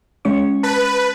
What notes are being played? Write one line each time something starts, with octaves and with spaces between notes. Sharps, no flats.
G#3 C#4 C#6
B4 A5